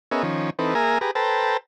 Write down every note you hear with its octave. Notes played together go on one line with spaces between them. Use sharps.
B3 C#4 G#4 A#4 D#5 E5
D#3 F3 C#4
E3 C4 D#4 A4 B4
A#3 G#4 A#4 E5 G#5 A#5
G4 G#4 B4 A#5
A4 B4 C5 G5 A5 A#5